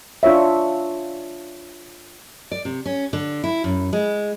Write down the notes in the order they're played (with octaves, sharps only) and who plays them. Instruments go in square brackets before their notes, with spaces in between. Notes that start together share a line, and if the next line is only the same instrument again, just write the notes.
[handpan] D4 F4 C#5 E5
[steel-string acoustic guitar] D5
C3
C#4
D3
E4
F#2
G#3